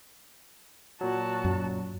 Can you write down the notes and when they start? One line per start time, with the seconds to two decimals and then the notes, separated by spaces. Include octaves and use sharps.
1.01 A#2 F#3 F#4 A5
1.44 F#2